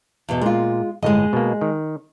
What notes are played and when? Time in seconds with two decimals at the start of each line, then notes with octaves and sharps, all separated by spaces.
0.29 E2 B2
0.41 A#2 G#3 F4
1.03 G1 A2 G#3 D#5
1.33 B2 A#3
1.61 D#3